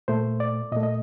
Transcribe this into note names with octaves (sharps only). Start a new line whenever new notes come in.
A#2 A3 C5
D5
A#2 A3 D#5
D#5